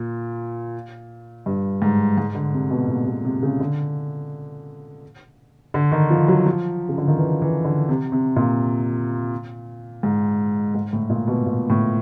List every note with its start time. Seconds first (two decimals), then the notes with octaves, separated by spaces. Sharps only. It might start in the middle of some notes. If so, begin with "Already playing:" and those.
Already playing: A#2
1.46 G2
1.82 G#2
2.18 G#2
2.35 D3
2.53 C3
2.70 B2
2.88 A#2
3.07 B2
3.25 C3
3.43 C#3
3.60 D3
5.74 D3
5.92 D#3
6.10 F3
6.28 F#3
6.46 F3
6.89 C#3
6.98 D3
7.08 D#3
7.17 E3
7.42 E3
7.65 D3
7.89 C3
8.12 C3
8.36 A#2
10.03 G#2
10.75 G#2
10.93 A2
11.10 A#2
11.28 B2
11.46 A#2
11.70 A2